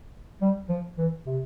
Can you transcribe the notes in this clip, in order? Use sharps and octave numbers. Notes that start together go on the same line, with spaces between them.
G3
F3
E3
C3